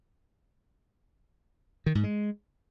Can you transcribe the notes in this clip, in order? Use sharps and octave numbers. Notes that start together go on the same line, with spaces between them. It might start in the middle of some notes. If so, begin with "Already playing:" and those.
D#3
G#2
G#3